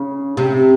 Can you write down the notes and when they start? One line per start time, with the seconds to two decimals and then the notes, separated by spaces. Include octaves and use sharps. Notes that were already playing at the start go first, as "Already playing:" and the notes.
Already playing: C#3
0.37 C3